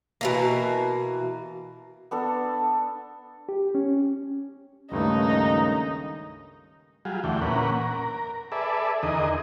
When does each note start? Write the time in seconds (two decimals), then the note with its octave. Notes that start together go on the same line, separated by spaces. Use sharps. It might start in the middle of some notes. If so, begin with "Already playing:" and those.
0.21 B2 E3 A#3
2.11 B3 D4 A4
3.49 G4
3.75 C#4
4.91 C#2 G2 D#3 A3 A#3 C#4 D#4
7.05 F#3 G3 F4 G#4
7.24 E2 D3 E3 A3 G5
7.41 A#2 A#3 C#4 B4 F#5
7.81 A#4
8.52 G#4 A4 B4 D5 E5
9.03 E2 D3 D#4 G#4 A#4 D#5